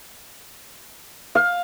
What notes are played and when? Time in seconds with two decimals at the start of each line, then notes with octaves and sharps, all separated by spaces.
1.35 F5